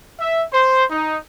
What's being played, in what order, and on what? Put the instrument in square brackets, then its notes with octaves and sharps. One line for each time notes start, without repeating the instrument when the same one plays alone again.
[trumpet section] E5
C5
D#4